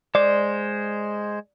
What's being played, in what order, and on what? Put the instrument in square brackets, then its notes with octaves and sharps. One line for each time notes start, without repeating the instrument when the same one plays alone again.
[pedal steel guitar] G#3 C5 [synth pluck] D5